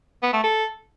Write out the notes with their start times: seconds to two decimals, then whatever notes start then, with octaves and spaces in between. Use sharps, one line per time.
0.23 B3
0.33 A3
0.43 A4